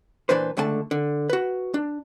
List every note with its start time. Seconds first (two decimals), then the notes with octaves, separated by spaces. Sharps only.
0.29 A#2 E3 D4 B4 C5
0.57 C#2 D3 A3 G#5 A5
0.91 D3
1.29 F#4 B4
1.74 D4